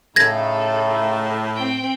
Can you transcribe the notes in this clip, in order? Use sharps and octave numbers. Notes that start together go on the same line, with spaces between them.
A2 C#3 A3 D#4 A4 G#6 A#6
C4 G5